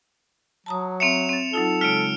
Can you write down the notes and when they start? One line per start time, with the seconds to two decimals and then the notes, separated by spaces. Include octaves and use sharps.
0.66 F#3 A5 A#5 D#6
1.00 C4 E5 C#7 E7 F7
1.29 C4 A6
1.53 F#3 D#4 F4 A4
1.81 C#3 G#3 F6 C#7 D7